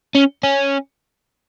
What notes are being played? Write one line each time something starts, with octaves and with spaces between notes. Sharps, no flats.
C#4
C#4